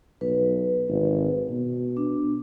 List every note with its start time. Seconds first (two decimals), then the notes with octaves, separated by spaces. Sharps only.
0.21 B1 B4
0.89 G#1
1.50 B2
1.97 D4